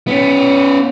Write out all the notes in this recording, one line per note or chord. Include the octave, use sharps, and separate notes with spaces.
B3 C#4